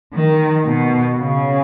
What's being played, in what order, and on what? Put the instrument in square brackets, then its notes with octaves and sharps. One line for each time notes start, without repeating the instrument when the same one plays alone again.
[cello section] D#3
B2
C#3